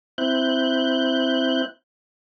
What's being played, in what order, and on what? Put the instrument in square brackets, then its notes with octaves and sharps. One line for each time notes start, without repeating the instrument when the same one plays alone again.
[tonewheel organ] C4 E4 F#6 G6